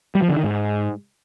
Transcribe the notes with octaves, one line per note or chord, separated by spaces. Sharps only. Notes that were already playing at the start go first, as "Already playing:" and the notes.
G3
F3
D3
D#3
G#2